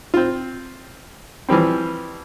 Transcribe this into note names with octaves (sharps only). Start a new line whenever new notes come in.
C4 F4
E3 F3 G3 C4